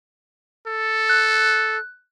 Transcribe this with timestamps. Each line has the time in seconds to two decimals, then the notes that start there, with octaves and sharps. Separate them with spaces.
0.67 A4
1.09 F#6